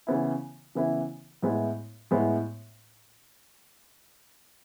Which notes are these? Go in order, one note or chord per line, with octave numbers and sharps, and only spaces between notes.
C#3 E3 B3 E4
C#3 E3 B3 E4
A2 G#3 B3 E4
A2 G#3 B3 E4